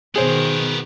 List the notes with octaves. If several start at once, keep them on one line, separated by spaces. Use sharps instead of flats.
B2 D#3 B3 G#4 A#4 C5